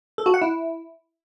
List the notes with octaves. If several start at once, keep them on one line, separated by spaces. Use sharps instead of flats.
A4
F#4
F#5
E4